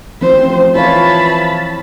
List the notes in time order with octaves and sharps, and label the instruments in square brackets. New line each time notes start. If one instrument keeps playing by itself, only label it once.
[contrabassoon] A1 [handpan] F3 C4 [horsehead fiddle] C5
[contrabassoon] E3 [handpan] F4 C#5 F5 [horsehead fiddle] A5 B5